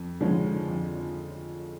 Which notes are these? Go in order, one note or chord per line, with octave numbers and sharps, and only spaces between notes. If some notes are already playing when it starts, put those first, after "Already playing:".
Already playing: F2
D3 F3 G#3 C#4
F2